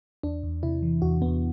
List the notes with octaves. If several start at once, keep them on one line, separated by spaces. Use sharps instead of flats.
E2 D4
E2
C3 E4
E3
E2 F#4
E2 B3